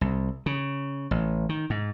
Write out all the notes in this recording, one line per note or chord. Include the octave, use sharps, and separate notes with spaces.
C2
C#3
A1
D#3
G#2